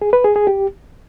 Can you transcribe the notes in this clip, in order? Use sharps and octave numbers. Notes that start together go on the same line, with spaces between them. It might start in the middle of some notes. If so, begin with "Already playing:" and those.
G#4
B4
G#4
G#4
G4